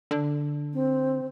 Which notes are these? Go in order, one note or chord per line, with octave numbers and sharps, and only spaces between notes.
D3
C4